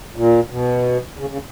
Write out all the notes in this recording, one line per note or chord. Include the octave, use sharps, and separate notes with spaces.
A#2
B2
C#3
C#3